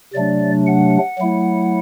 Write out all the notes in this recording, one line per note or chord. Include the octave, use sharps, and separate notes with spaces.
C3 F#3 A3 D4 D5
F#5
F#3 A3 E4